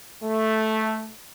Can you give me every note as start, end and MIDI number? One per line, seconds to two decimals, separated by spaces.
0.23 1.09 57